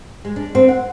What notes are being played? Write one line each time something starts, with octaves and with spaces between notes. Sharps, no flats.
G#3
D4
C4
F#5